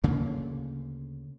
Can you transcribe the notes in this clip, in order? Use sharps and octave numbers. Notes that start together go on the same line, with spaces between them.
D2 C#3 A#3